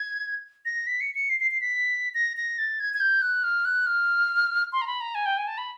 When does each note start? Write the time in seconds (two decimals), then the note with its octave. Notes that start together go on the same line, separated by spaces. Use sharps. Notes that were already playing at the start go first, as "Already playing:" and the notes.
Already playing: G#6
0.65 A#6
0.87 B6
1.01 C#7
1.15 C#7
1.30 C7
1.40 C7
1.51 C7
1.61 B6
2.14 A#6
2.37 A#6
2.58 A6
2.80 G#6
2.94 G#6
3.00 G6
3.22 F#6
3.43 F6
3.65 F#6
3.86 F6
4.72 C6
4.82 A#5
4.87 B5
5.01 A#5
5.15 G#5
5.26 G5
5.37 G#5
5.47 A5
5.58 B5